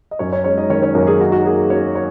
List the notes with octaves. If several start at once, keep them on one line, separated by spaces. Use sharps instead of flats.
D#5
F#2 C#4 C#5
C#4 C#5
G#3 C#4 C#5
D#4 D#5
D#3 C#4 C#5
C#4 C#5
F#2 A#3 A#4
G#4
D#4 F#4
F#4
A#3 G#4
F#3 C#4 C#5
C#5